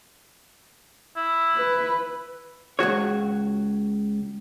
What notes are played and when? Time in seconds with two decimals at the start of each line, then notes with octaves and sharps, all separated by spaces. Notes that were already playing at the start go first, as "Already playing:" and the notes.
1.16 E4
1.55 B4
2.79 C#2 G#2 F#4 C#5